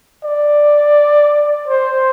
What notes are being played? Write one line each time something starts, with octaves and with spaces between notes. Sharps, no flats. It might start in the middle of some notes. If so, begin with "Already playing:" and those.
D5
C5